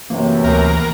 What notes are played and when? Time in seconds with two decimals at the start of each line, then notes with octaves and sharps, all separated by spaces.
0.10 F#2 A2 C3 E3 A#3
0.44 D2 B2 A#3 A#4